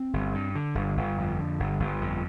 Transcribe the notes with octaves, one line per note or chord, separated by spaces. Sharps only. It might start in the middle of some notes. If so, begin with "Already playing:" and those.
Already playing: C4
G1
G2
D3
G1
G1
F2
D3
G1
G1
F2